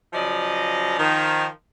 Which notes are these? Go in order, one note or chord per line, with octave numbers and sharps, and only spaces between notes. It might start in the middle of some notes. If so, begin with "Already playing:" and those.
C#3 F3 F#3 D5 D#5
D#3 F3